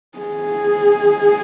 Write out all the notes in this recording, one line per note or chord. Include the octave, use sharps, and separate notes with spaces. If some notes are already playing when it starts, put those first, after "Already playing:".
G#4